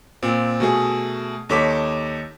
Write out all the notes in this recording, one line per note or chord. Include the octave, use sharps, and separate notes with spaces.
A#2 C4
B2 A3 G#4
D#2 D#4 A4 C#5 D6 B6